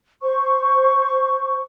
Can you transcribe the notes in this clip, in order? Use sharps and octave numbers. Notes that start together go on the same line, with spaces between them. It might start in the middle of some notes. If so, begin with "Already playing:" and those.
C5 C#6